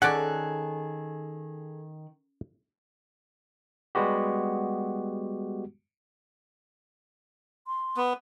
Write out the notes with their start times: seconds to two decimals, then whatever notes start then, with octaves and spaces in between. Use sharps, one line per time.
0.02 D#3 C#4 G#4 A4 D5 F#5 F#6
3.95 G3 G#3 B3 F#4 G4
7.67 C6
7.97 B3